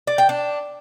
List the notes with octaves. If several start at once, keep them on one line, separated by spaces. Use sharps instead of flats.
D5
G5
D4